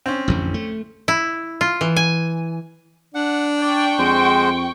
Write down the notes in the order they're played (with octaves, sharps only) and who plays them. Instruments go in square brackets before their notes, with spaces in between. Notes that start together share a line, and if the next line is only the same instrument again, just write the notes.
[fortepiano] C4 C#4
[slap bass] A1 F2 D3
A3
[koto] E4
F4
E3
G#5
[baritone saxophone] D4 [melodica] F#5
[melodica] D5 [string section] G5 C#6
[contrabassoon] F2 [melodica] G#3 C5